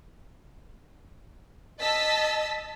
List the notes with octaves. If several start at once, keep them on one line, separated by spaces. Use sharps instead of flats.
D#5 A5 E6 A6 B6